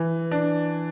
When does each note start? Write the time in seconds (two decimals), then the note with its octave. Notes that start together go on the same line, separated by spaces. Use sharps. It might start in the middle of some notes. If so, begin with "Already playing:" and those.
Already playing: E3
0.31 D4